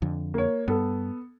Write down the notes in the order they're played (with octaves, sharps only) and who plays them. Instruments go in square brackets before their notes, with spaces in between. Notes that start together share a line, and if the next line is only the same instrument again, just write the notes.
[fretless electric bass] F2 D3
[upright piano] A#3 C#5
[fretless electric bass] G2 [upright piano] B3 A4